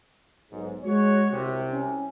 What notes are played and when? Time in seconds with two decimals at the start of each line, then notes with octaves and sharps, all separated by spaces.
0.52 B1 G#2
0.84 G#3 F#4 C#5
1.32 C2 C3
1.70 C#4